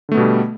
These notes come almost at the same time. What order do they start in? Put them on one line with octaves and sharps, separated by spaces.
D3 A3 B3 B2 G3